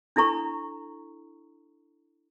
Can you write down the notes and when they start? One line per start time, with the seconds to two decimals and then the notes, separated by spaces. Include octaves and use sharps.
0.16 D4 E4 A4 A#5 C#6